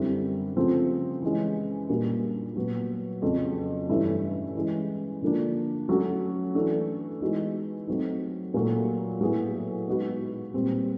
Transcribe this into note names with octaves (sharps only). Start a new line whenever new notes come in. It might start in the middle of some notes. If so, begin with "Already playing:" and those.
Already playing: F#2 D3 G3 C4 E4
C#3 F3 A3 C4
E3 G#3 C#4
A#2 G3 A#3 D4 F#4
A#2 F#3 B3
F2 C#3 F#3
G2 E3 A3 C#4 E4
E3 G#3 C#4
D3 F3 A#3 D4
F#3 A3 C#4 F#4
E3 A3 D4
E3 G#3 B3 D#4 F#4
F#3 A3 C4 D#4
A#2 F#3 A3
A2 F#3 B3 E4 G#4
G#3 B3 D#4 F#4 B4
A#2 G3 C4